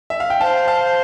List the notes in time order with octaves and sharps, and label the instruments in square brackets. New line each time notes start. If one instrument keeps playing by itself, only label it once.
[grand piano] E5
F5
G5
[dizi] C5 [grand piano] F5 A5
[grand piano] F5 A5